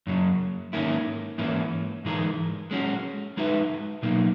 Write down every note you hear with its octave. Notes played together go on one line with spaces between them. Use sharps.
F#2 C#3 F#3
G#2 D#3 A#3 C#4 E4
G#2 E3 A#3 C#4 E4
G#2 E3 G#3 D#4 A#4
G#3 C#4 F#4
G#3 D#4 F#4 B4 E5
B2 F#3 A#3 D#4